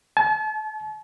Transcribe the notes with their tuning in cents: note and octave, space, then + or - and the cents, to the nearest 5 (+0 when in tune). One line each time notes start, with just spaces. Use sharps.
A5 -40